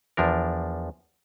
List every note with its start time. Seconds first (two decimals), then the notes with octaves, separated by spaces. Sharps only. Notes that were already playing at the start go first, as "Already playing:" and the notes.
0.17 E2 F3 D4 A#4